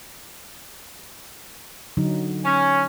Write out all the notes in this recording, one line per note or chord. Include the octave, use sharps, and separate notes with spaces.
D3 F#3 D#4
C#4